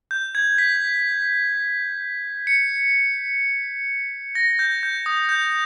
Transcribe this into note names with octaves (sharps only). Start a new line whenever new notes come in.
G6
G#6
B6
C#7
A#6
G6
G6
D#6
G6